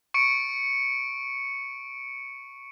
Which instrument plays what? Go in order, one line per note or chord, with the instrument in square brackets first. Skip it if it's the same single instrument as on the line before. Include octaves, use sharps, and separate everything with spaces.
[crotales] C#6 C#7 D7